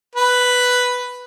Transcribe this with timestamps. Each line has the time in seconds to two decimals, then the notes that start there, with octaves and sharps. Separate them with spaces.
0.15 B4